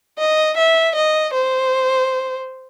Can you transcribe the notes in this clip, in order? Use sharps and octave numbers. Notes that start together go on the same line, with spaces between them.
D#5
E5
D#5
C5